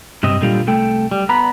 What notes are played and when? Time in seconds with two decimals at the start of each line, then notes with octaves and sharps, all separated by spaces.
0.23 G2 C3 C4 D#5
0.41 A#2 D3 G3 F4
0.67 C2 A3 A4 G5
1.11 G3
1.29 B3 A#5 B5